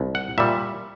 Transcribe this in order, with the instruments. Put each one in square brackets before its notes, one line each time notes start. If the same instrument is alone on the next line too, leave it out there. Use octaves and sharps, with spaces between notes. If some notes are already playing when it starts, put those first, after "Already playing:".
Already playing: [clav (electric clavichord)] C2
F#5
A#2 G3 E5